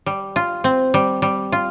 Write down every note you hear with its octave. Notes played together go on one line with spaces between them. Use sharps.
G3
F4
C4
G3
G3
F4